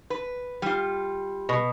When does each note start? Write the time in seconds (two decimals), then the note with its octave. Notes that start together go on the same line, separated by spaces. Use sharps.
0.10 B4
0.62 G3 F4
1.49 B2